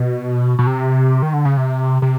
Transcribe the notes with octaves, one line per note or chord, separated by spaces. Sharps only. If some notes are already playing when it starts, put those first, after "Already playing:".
Already playing: B2
B2
C3
D#3
D3
C#3
C3
C3